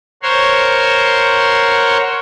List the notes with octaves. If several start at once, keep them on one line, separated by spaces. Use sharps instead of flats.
A#4 C5 C#5 F#5 C6